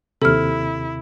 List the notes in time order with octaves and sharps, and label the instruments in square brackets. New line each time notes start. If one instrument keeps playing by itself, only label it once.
[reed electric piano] D#2 C3 [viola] E4 [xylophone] A4 F6